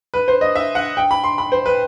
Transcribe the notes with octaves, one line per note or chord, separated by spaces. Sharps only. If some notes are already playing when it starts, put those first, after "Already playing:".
B4
C5
D#5
E5
F#5
G5
B5
C6
B5
C5
B4